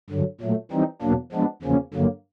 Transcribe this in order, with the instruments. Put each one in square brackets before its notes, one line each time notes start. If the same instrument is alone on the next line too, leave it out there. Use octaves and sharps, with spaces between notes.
[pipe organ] G2 D3 F#3
A#2 F#3 A3
E3 G3 C4 D#4
E2 B2 F#3 A#3 D4
F3 G#3 B3 D4
E2 C#3 F3 A#3 C#4
G2 D3 F#3 A#3